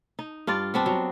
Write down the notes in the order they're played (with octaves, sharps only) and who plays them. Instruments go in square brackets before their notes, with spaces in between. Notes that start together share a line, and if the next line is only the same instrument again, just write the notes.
[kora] D#4
G2 F4 D5
B3 C4 D4
F#3